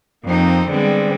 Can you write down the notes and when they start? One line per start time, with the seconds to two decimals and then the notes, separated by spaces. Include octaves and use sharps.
0.24 F2 A#3 C4 D#4
0.70 D3 G3 G#3 B3 C4